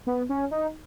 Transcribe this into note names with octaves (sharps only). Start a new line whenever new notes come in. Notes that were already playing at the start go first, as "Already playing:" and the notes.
B3
C#4
D#4